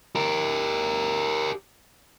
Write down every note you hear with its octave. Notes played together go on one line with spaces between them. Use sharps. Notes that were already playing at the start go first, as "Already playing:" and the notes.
G4 A#4